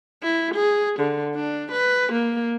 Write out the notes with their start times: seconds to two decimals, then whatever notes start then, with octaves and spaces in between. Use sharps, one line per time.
0.23 E4
0.54 G#4
1.00 D3
1.35 D4
1.72 B4
2.12 A#3